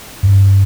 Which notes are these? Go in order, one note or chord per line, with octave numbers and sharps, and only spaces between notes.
G2